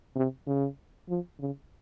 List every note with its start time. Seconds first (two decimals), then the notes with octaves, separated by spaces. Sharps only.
0.16 C3
0.47 C#3
1.09 F3
1.40 C#3